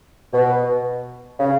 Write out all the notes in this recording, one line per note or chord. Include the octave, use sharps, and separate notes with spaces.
B2
C#3